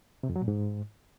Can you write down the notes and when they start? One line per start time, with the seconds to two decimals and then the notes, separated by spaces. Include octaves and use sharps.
0.23 C3
0.30 F2
0.36 F#3
0.42 A#2
0.48 G#2